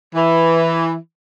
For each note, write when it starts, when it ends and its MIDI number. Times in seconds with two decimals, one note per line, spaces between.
0.15 0.94 52